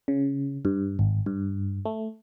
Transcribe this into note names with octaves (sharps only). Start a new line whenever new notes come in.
C#3
G2
G#1
G2
A3